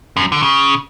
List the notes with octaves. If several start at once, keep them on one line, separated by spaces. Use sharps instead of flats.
F#2
D3
C#3